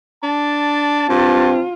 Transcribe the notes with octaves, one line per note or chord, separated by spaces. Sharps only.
D4 A5
G2 C4 F4